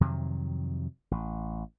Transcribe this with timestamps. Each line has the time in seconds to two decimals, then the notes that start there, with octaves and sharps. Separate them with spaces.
0.01 F2 C3 D#3 F#3
1.11 A1